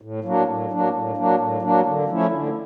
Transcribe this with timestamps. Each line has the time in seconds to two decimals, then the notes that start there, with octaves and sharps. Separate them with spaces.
0.02 A2
0.24 F#3 A#3 D4
0.47 A2
0.71 F#3 A#3 D4
0.93 A2
1.17 F#3 A#3 D4
1.39 A2
1.62 F#3 A#3 D4
1.86 D3
2.08 F3 A3 C#4 E4
2.31 D3